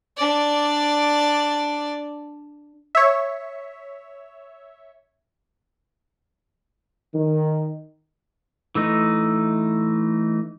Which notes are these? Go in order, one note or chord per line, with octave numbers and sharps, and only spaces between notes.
D4 D5
C#5 E5
D#3
E3 A3 D#4